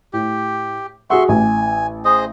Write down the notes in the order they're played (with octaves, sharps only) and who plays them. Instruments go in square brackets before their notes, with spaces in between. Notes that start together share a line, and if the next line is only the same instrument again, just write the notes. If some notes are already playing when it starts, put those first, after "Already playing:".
[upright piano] A2 [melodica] G4
[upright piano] F#4 G#4 F#5 [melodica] E5 C6 C#6
[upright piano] A1 [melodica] G#5
[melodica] G#4 C5 D#5